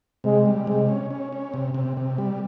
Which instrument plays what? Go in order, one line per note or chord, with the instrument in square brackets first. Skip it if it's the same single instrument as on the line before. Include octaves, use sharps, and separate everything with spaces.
[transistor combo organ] C3 [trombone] G#3
[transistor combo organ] G3
[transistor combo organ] C3 [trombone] G#3
[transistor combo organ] C#4
C#4
C#4
C3
C3
C3
G3